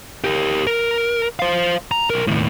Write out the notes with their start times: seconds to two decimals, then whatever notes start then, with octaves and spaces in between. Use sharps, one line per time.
0.24 G4 A#4
0.67 A#4
1.39 C5 F5
1.91 A#5
2.10 B1 A#4
2.27 D#2 A2